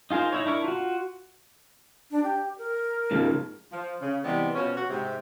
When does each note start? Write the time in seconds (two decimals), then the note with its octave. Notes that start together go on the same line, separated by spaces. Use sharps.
0.11 D#4 F4 G#4 A#4 C5
0.33 D#4 E4 C#5
0.46 D4 E4 A#4 C#6
0.64 F4 F#4
2.11 D4
2.24 G4
2.58 A#4
3.11 G#2 C#3 F3
3.71 F3
4.00 C#3
4.23 C3 E3 G3 G#3 B3
4.54 B2 F3 C#4
4.75 F#4
4.90 G#2 C3